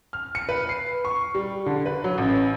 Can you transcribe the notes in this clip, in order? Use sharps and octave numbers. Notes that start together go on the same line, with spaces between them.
F6
C#7
B4
C7
C#6
G3
D3
B4
F#3
A1